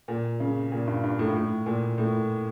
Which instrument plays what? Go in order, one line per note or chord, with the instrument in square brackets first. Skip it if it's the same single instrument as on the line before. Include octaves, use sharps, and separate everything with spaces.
[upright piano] A#2
C#3
A#2
G2
G2
A2
A2
A#2
A2